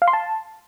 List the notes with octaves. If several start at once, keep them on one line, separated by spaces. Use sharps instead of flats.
F5
C6
A5